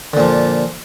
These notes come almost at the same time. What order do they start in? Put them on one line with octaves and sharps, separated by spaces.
D3 A#2 F3